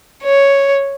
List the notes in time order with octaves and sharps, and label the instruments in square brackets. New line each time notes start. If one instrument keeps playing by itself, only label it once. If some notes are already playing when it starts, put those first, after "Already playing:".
[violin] C#5